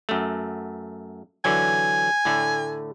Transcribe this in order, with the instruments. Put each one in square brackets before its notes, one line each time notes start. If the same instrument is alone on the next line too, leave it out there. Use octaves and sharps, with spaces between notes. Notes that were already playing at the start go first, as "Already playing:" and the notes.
[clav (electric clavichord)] F#2 A3
[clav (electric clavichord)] D3 E3 F#3 [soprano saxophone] G#5
[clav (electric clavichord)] A2 D3 A3